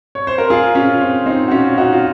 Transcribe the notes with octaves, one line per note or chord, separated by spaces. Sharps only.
C#5
C5
A#4
F4 G#4
C#4 F4
C4
C4 D#4
F#4
C#4 F4
D#4 F#4
F4